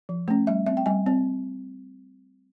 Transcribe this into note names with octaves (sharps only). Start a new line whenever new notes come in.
F3
A3 C#4
G3 E5
C4 E5
G5
G3 G#5
C4